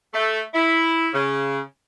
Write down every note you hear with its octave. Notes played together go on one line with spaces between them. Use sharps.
A3
E4
C#3